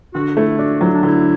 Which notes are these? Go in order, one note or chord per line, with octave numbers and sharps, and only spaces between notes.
D3 F#4
A3 E4
D4 F#4
F#3 E4
D4
D3 E4